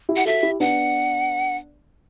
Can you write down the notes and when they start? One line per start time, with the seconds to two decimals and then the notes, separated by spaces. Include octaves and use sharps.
0.09 E4 G4
0.16 F#5
0.26 F#4 A4 E5
0.43 E4 G4
0.60 B3 D4 F#5